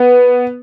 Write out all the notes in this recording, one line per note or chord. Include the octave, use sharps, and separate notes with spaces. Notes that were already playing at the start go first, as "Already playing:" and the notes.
Already playing: B3